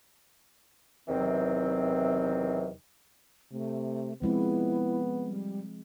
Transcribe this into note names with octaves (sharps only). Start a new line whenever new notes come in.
E2 C3 D#3 E3 F#3 C4
C3 A3
F3 G#3 B3 C4 E4
G3